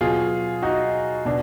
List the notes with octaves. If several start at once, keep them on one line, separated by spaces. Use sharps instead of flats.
B2 F#3 F4 G#4
D#4 F#4
B2 D4